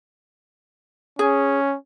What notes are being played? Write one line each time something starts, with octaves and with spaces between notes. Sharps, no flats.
C#4 G#4